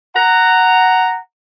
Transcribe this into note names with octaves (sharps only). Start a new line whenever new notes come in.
F#5 A#5